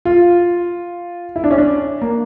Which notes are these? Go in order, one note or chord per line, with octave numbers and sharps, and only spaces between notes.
F4
E4
D4
C#4
D4
A#3